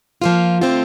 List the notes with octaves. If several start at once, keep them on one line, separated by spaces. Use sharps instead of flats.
F3 A#3 F4
D3 A3 C4 F4